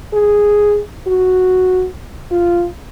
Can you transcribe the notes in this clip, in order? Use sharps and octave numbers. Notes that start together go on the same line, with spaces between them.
G#4
F#4
F4